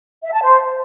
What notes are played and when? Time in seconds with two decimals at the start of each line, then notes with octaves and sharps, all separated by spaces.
0.24 E5
0.33 A5
0.42 C5